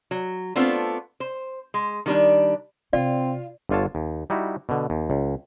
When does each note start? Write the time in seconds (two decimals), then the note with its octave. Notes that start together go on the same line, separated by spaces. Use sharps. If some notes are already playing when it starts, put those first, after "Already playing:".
0.11 F#3
0.56 A3 B3 C4 D4 F4
1.20 C5
1.74 G#3
2.06 D#3 G3 D4
2.93 C3 C4 F4 D5
3.69 G1 D3 F4 C#5 A5
3.95 D#2
4.30 G3 D#4 E4 F#4
4.69 B2 D3
4.90 D#2
5.10 C#2